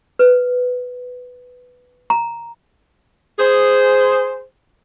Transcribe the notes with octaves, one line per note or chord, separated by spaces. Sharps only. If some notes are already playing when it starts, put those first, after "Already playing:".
B4
A#5
G#4 C5